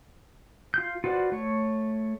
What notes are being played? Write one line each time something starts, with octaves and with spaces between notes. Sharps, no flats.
F4 G6
F4 F#4 B4 C5 D5
A3 C#5